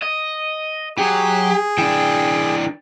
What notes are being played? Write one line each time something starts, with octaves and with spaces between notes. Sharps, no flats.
D#5
F#3 G4 G#4
E3 D4 G5